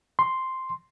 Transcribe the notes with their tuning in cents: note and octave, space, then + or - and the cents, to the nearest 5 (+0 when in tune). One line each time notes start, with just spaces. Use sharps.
C6 +0